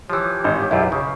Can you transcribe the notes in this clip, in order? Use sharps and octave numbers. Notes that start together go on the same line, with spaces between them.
E3 F3 G4 C#5
G#1
B1 F#2 E4 F4
C#3